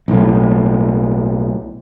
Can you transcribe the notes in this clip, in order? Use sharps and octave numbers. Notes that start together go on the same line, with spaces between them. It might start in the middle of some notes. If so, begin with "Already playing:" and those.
B1 A2